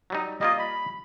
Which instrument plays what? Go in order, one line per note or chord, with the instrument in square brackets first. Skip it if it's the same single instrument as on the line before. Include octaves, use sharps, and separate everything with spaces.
[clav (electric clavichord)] F#3 G3 D#4
[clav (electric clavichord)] G3 A#3 F4 [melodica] D#5
[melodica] B5